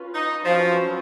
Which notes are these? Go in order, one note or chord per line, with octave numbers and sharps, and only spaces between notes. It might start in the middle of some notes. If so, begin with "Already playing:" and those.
Already playing: C#4 F4 B4
D#4
F3 F#3 C#4 F4 B4